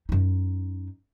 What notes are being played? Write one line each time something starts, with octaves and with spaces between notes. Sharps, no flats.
F#2 D#4